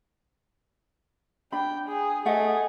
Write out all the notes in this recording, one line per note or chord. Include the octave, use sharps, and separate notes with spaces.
D4 G5 B5
G#4
A3 G#4 D#5 F#5